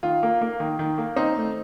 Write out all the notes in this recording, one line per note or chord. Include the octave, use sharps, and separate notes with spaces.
D#3 F4
A#3
A#3
D#3
D#3
A#3
C4 D#4
A3